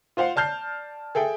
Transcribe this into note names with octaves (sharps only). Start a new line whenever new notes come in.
F4 C5 F5 F#5
D5 A5 F6 G6 C7
G#4 A4 E5 G5